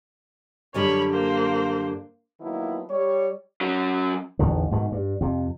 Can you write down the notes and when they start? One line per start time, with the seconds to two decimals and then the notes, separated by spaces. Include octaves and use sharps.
0.74 F#2 D3 G3 C#5 B5
1.12 A#3 C5
2.40 D#3 F3 F#3 A#3 B3 E4
2.90 G3 C#5
3.61 F#3 C#4
4.39 A1 E2 D3 D#3
4.71 G#2 B2 D#3
4.92 G2
5.21 F2 C3